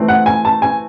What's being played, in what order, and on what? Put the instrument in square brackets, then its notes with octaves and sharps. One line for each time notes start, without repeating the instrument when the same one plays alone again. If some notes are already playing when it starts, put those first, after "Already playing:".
Already playing: [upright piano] E3 A3 C4
F#5
G#5
A5
G#5